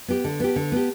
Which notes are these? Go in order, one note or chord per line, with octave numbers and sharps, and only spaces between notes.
B3 G4
D3
B3 G4
D3
B3 G4